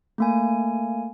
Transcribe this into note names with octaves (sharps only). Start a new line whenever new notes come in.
A3 A#3 G#5